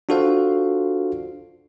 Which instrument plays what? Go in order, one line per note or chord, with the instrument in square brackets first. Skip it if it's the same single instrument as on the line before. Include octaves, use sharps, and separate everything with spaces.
[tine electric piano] D4 F4 F#4 A4 C5 F5